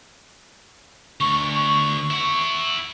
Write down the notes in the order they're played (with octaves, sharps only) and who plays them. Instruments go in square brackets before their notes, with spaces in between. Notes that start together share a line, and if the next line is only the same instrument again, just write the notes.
[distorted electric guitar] D2 [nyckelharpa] C#6
[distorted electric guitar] E4 F#5